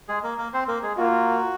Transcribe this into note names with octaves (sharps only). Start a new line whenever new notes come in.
G#3 G#4
A#3 A#4
A#3 A#4
C4 C5
A#3 A#4
G#3 G#4
A#3 F4 F#4 A#4